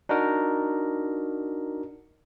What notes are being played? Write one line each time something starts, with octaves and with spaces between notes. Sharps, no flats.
D4 D#4 F#4 A#4